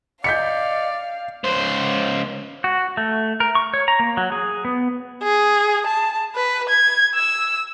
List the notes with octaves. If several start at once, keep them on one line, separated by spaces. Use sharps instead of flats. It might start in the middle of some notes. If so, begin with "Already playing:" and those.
D5 D#5 F5 G6 B6 C#7
C#2 C5
F#4
A3
A#4
C#6
C#5
A#5
A#3
F#3
G#4
B3
G#4
A5
B4
G#6
E6